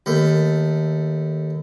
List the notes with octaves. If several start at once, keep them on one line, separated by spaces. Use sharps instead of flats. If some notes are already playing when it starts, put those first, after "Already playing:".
D#2 A3